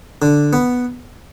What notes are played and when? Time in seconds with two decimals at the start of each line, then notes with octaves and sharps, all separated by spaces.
0.22 D3
0.53 B3